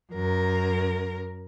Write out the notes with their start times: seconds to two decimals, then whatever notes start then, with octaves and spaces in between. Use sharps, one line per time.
0.13 F#2 A#4